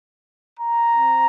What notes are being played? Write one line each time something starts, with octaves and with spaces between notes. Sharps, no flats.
A#5
C4